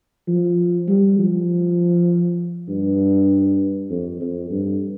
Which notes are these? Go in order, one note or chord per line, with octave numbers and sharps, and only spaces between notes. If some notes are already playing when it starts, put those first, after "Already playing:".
F3
G3
F3
G2
F2
F2
G2